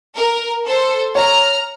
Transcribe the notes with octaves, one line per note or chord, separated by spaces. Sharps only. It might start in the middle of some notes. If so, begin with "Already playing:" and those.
A#4
A4 C5
C#5 A#5 F6